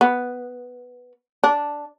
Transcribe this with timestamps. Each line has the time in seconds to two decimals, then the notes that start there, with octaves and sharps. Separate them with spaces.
0.01 B3
1.44 D4